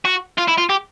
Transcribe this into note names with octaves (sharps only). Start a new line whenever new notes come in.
F#4
F4
E4
F4
G4